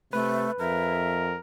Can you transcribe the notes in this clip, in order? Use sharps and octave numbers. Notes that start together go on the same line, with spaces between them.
C3 A3 B4
F2 A#4 E5